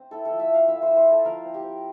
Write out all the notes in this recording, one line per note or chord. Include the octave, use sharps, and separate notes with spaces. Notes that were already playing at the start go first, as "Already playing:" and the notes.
Already playing: C4
E4 A4
A4
F3
E5
F3 F5
E4 E5
C5
E4
C5
E4 A4
F3 A#4
C4
G4
C4